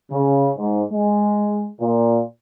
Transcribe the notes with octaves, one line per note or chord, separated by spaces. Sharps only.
C#3
G#2
G#3
A#2